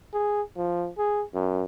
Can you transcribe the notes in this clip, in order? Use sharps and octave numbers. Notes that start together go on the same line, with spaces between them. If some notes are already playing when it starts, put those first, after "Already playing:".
G#4
F3
G#4
F#2